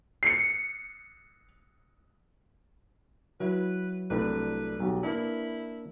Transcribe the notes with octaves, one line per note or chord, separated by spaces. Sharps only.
C7 C#7
F#3 E4 B4
C2 A3 D4 B4
B1 F#4 G4
A#3 D4 E4 B4